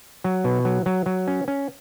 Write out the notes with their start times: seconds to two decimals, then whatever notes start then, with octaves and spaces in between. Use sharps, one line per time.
0.24 F#3
0.44 B2
0.65 F#3
0.86 F#3
1.06 F#3
1.28 C#4
1.48 C#4